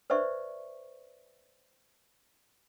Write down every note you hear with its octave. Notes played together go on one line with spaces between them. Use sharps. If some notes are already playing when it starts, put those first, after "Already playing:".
B4 C5 D5 E5 C#6